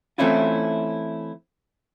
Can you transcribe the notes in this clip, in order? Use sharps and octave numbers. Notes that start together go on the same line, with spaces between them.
E3 A3 C4 C#4 E4 F4